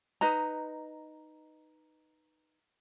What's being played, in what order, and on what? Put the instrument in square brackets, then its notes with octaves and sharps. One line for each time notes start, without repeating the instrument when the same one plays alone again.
[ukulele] D#4 B4 D#5 A#5